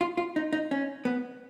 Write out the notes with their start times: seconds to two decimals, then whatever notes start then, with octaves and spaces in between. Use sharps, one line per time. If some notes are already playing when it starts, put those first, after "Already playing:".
0.01 F4
0.17 F4
0.36 D#4
0.53 D#4
0.71 C#4
1.05 B3